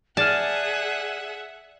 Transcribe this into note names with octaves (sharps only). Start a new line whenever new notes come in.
G#4 D5 E5 F#5 A5 F6